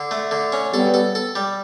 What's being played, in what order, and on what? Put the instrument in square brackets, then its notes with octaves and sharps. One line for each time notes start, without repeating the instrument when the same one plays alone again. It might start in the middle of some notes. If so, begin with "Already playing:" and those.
Already playing: [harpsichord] D3
A3
D3
C#4
[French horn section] G3 B3 [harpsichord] A4
[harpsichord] A4
A4
G3